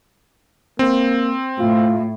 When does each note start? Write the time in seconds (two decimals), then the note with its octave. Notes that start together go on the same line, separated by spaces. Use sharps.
0.79 A#3 C4
1.59 A2 F4